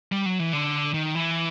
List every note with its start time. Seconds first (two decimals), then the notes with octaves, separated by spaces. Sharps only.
0.12 G3
0.26 F#3
0.40 E3
0.53 D3
0.94 D#3
1.15 E3